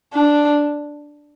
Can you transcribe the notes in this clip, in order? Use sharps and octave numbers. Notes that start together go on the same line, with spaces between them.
D4